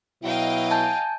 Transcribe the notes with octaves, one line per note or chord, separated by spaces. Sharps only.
B2 F#3 E4 D#5 F5 G5
G#5 A5 G6